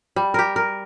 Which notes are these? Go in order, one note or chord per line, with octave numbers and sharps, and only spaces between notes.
G3
G4 A#4
A#4